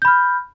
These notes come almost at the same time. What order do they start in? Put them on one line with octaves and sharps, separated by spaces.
G6 B5 F6